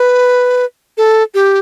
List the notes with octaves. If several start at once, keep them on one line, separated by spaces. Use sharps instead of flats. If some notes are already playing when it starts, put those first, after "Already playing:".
Already playing: B4
A4
G4